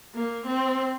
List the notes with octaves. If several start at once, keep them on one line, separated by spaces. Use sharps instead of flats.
A#3
C4